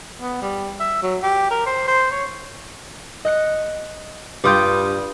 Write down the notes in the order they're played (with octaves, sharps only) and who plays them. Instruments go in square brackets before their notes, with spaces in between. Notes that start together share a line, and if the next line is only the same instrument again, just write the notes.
[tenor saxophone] B3
G3
E5
F#3
G4
A#4
C5
C5
C#5
[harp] D#5 F#6 C#7
[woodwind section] G2 [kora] G3 F4 G5 [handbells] D6 D#6 G6